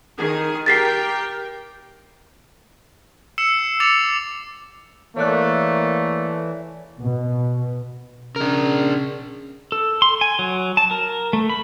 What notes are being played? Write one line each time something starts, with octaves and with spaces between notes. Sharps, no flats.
D#3 G#4
G4 A#4 G5 A6 B6 C7
E6 C7 C#7 E7
D6 A6 C#7 E7 F7
E3 A3 A#3 C#5 D5 F#6
B2
C#3 D4 A#4
A4
C6
G#5
F#3
A5
A#4
A3
B5